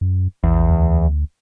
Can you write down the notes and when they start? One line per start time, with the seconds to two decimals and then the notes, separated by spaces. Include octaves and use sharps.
0.01 F#2
0.44 A#1 E2
0.70 D2